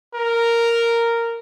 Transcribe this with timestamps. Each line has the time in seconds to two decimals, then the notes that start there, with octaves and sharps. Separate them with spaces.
0.14 A#4